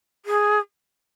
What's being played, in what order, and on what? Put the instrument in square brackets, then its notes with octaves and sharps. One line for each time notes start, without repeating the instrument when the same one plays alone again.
[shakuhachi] G#4